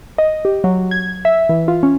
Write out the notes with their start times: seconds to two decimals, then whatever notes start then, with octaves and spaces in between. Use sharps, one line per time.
0.18 D#5
0.45 G4
0.64 F#3
0.91 G#6
1.25 E5
1.49 E3
1.68 F4
1.83 C#4